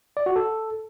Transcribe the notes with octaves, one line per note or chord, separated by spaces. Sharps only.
D5
F#4
A4